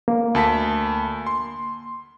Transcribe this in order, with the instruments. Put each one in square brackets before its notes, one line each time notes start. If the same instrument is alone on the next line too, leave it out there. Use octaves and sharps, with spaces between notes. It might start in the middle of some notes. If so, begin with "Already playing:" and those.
[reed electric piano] A#3
[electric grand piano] D2 A5 B6
C6